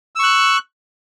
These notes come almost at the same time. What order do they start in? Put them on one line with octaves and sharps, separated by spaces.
E6 C#6 F#6